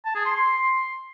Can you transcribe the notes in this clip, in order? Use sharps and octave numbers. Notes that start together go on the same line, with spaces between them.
A5
G#4
C6
C6